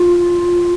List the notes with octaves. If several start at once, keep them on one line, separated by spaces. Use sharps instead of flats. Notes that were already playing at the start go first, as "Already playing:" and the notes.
Already playing: F4